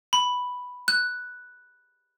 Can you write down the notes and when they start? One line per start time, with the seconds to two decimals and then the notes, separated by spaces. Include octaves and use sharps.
0.13 B5
0.88 F#6